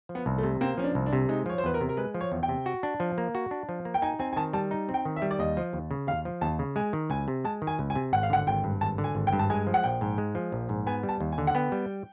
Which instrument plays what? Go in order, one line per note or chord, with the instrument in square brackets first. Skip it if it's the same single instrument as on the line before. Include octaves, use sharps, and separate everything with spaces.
[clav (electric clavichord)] F3
[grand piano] B3
[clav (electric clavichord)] C2
[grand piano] A3
[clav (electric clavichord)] C3
[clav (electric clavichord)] A#3 [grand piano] C4
[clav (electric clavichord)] F3 [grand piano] C#4
[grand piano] D4
[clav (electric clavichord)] C2
[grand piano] D4
[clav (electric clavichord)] C3
[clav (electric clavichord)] G#3 [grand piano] D#4
[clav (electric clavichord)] F3 [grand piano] C#5
[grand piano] C5
[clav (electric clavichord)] E2 [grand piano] B4
[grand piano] A#4
[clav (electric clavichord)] C3
[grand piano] A#4
[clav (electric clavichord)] G#3 [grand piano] B4
[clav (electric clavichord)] F3
[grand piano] C#5
[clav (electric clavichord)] E2
[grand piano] G5
[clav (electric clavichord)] C3
F#4
D4
F3
A#3
F#4
D4
F3
A#3
[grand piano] G5
[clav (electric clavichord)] D#4 [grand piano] G#5
[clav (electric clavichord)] C4 [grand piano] G#5
[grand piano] G#5
[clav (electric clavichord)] D#3 [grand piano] A5
[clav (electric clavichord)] G3 [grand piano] A5
[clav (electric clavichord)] D#4
C4
[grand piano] G5
[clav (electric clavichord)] D#3
[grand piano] E5
[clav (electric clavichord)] G3
[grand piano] D5
[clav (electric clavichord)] D#2 [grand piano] D#5
[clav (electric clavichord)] F3
D#2
C#3
[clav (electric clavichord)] D#2 [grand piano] F5
[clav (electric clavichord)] F3
[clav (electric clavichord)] D#2 [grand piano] A5
[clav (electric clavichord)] C#3
[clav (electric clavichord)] G#3 [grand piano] G#5
[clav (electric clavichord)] D#3
[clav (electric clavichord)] C#2 [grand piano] G#5
[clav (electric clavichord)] C3
[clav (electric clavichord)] G#3 [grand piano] A5
[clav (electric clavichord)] D#3
[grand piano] G#5
[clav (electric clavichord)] C#2
[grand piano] G#5
[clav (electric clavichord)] C3
[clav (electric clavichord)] G#1 [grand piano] F#5
[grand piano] F5
[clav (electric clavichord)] D3 [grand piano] F#5
[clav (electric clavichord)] G#1 [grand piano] G5
[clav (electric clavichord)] G2
[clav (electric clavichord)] G#1 [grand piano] A5
[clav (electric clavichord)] D3
[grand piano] G#5
[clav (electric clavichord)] G#1
[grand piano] G5
[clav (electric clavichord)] G2
[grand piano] A5
[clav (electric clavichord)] G#3 [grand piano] G#5
[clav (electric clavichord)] F3
[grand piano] F#5
[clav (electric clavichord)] A#1 [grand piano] G5
[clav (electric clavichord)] G#2
G#3
F3
A#1
G#2
[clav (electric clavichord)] B3 [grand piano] G#5
[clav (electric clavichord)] G3
[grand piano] A5
[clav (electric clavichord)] D#2
[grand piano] G#5
[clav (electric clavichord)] D3
[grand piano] F#5
[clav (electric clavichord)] B3 [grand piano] G5
[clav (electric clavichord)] G3